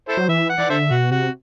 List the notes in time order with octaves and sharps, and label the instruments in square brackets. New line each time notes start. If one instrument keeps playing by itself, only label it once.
[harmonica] E4 A4 C5
[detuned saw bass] F#3
[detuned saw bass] E3 [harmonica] E5
[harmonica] F#5
[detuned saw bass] E3 [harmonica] D5
[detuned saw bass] D3 [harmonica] A4 C5 E5
[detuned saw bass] B2 [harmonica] F#4
[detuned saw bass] C3 [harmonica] F#4